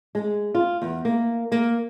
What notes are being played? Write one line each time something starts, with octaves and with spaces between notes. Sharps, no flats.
G#3
F4
E2
A#3
A#3